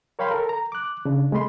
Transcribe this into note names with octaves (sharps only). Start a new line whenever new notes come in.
A#4 C#5 F5 G5 B5 C6
A4 A#4
A#5
D6 F#6
C#3 D4
C3 G#3 A3 B5 C6